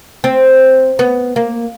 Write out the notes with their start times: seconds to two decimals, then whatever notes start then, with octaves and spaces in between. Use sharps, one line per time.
0.24 C4
0.99 B3
1.36 A#3